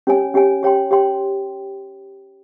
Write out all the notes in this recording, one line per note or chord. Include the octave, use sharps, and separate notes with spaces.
C#4 G4 C#5 G#5
C#4 G4 C#5 G#5
G4 C#5 G5 C6
G4 C#5 G5 C6